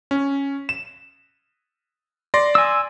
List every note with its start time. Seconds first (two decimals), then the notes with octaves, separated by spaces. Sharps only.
0.11 C#4
0.69 E7
2.34 D5 C6 A#6
2.55 G#5 E6